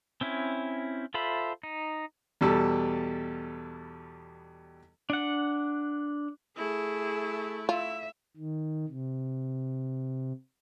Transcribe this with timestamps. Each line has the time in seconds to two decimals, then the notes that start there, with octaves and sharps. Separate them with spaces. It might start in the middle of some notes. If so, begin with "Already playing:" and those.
0.21 C4 C#4 E4
1.14 F4 A4 C5 E5 B5
1.63 D#4
2.41 E2 B2 G3 A4
5.10 D4 F#5
6.57 A3 E4 G#4
7.69 F4 E5
8.36 D#3
8.88 C3